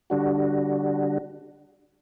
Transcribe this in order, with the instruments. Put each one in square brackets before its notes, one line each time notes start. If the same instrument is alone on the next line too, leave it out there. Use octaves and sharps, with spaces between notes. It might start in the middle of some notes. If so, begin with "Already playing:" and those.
[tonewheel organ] D3 G3 D4 F#4